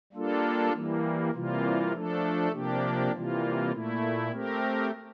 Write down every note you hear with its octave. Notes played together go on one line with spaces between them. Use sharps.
G3 A#3 D4 F4 A4
E3 G3 A#3
C3 E3 G3 A#3 F4
F3 A3 D4 A4
C3 F3 A#3 D4 G4
C3 E3 G3 A#3 F4
A#2 A3 E4
A3 C4 G4 A#4